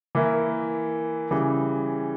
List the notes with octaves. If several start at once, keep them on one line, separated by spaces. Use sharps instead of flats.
E3 A#3 E4 A#4
C#3 E3 G3